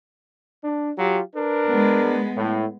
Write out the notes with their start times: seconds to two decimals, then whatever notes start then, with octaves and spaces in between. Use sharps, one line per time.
0.64 D4
0.98 F#3 F4 G4
1.36 D4 A#4 B4
1.70 G#3 B3
2.37 A2